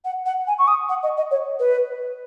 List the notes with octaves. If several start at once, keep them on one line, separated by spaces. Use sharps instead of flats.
F#5
F#5
G#5
C#6
D#6
F#5
D#5
D#5
C#5
B4